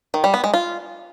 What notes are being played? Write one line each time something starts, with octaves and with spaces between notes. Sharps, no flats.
D#3
G3
B3
G#3
F4